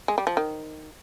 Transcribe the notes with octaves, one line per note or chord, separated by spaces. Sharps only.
G#3
G3
F3
D#3